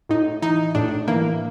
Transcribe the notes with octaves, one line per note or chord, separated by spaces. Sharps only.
A2 D#4
E3 D#4
A2 D4
E3 A#3